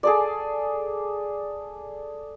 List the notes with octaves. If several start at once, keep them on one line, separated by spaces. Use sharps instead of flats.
G#4 A4 D5